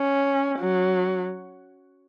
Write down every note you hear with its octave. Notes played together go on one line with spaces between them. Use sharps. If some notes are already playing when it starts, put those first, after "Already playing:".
Already playing: C#4
F#3